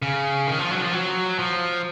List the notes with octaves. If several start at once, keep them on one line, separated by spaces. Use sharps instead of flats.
C#3
D#3
F3
F#3
F3
F#3
F3